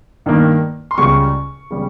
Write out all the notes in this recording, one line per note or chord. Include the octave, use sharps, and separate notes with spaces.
G2 D#3 A#3
C6
C#2 C#3 G3 C#6
C#3 G3